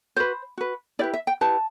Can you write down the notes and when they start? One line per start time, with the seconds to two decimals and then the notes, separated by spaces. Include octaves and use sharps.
0.16 F#4 B4 C5
0.58 F#4 B4
0.99 E4 G4 B4 D5
1.13 E5
1.27 G5
1.41 E4 G4 B4 A5